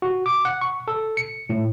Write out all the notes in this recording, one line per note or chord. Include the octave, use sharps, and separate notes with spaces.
F#4
D6
F#5
C#6
A4
C#7
A2